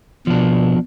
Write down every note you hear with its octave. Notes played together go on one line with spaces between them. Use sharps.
B2 F3 D4